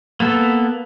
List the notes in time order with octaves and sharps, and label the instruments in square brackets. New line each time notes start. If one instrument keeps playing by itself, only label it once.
[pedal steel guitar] A#3 B3 A4